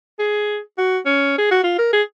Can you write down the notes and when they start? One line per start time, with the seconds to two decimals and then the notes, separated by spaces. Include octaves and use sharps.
0.19 G#4
0.78 F#4
1.06 C#4
1.38 G#4
1.51 F#4
1.64 F4
1.78 A#4
1.92 G#4